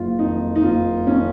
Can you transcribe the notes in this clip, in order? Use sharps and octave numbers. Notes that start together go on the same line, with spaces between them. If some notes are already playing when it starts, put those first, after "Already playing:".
Already playing: F#1 F4
F2 D#3 D#4
D#4
F#1 F4
F2 D#3 C#4